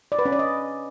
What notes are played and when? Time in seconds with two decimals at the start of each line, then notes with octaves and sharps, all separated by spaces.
0.12 D5
0.19 B4
0.25 C#4
0.32 D5
0.39 D#5